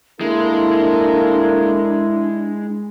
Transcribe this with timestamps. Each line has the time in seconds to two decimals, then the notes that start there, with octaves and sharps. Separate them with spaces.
0.21 G#3 A#3 D4 E4 A4 A#4